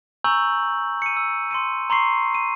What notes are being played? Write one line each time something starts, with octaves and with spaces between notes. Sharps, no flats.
G#5 A#5 C#6 E6 G6 F#7
C#7 D#7
E6
C6 C#7 D#7
A#5 C6 C#6 C7
D#7